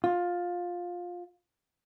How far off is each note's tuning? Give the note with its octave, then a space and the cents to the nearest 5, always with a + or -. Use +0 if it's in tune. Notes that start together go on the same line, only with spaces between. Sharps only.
F4 +15